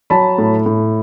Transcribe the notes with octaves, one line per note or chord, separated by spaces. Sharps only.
F#3 A5 B5
A2
A2